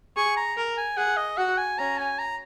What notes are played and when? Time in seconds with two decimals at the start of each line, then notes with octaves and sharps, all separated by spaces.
0.16 G#4 C#6
0.37 A#5
0.57 A#4
0.77 G#5
0.97 G#4 F#5
1.17 D#5
1.37 F#4 F#5
1.58 G#5
1.78 C#4 A#5
1.98 G#5
2.19 A#5